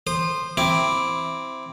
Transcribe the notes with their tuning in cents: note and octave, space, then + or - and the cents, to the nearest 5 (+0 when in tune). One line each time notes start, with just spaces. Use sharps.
C5 +0 D#6 -35
C4 +0 E4 +0 D6 +0